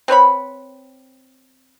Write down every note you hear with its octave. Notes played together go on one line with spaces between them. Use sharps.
C4 B4 C#5 B5